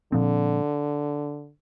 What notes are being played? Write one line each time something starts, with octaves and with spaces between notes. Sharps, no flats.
A#2 D3 F3 C4